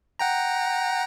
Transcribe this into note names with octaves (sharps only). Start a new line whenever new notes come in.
F#5 G5 A#5